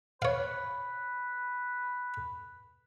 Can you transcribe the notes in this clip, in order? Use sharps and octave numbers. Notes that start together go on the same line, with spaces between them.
B4 C#5 F5